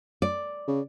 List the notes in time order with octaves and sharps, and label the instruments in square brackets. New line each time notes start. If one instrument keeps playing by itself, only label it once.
[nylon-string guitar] D5
[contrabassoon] C#3